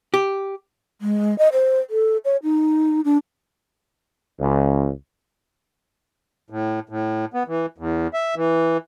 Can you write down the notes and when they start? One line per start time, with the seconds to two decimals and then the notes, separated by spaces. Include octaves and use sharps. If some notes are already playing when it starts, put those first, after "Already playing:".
0.14 G4
1.01 G#3
1.39 D#5
1.53 C5
1.90 A4
2.25 C#5
2.43 D#4
3.05 D4
4.40 C#2
6.50 A2
6.89 A2
7.34 B3
7.48 E3
7.78 E2
8.14 E5
8.36 E3